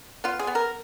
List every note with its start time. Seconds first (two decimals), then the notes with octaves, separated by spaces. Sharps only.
0.24 B3 F4
0.39 G#4
0.47 B3
0.55 A#4